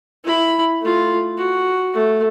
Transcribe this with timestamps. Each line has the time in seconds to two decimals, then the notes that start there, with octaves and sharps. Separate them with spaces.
0.25 E4 B5
0.82 A3 F4
1.38 F#4
1.94 A3